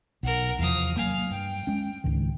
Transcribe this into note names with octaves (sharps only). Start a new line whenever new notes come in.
B1 A#4 F#5
E2 C3 F3 F5 D#6
F#3 G#3 A#3 F5 G#5
G2 G5
G#3 C#4
C#2 G#2 D#3